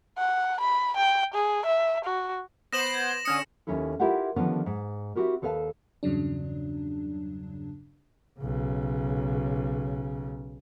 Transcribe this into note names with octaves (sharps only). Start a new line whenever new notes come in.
F#5
B5
G5
G#4
E5
F#4
B3 C5 A#6 D7 E7 F#7
G#6
D3 C#4 D#6 C#7 E7
D#2 C#4 D#4 E4 A4
E4 F4 G4 A#4 E5 F#5
D3 D#3 F3 G3 B3 C#4
G#2
C4 E4 F#4 G4 A#4
D#2 A4 B4 D5 F5 A5
E2 G2 C#3 F#3 D4
B1 C#3